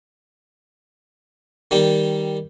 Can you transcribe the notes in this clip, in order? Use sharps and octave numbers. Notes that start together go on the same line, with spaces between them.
D#3 G3 G4